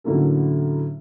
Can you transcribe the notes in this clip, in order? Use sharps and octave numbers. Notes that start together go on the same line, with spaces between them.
A2 D3 F#3 A#3 C#4 A4